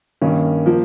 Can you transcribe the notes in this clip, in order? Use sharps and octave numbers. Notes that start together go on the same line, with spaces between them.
G2 D#3 A#3 C#4
F3 A#3